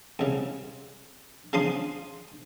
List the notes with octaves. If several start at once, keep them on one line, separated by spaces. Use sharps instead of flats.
C2 C#3
C#3 F3 D4 C6 D#6